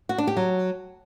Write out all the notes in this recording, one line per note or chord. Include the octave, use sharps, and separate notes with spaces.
F#4
D4
G4
F#3